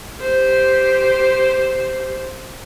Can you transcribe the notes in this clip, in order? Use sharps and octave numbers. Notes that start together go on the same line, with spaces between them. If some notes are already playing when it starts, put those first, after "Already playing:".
G4 C5